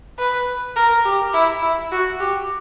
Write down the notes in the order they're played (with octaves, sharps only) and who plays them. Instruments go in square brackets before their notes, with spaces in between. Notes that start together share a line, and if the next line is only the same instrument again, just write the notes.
[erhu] B4
A#4
G4
E4
E4
F#4
G4